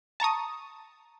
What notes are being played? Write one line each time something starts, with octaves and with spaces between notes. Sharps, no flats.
A5 A#5 C#6 D#6